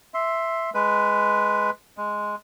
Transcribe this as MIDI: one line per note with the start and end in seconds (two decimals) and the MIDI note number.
0.14 0.70 76
0.14 0.70 84
0.74 1.70 56
0.74 1.70 71
1.98 2.35 56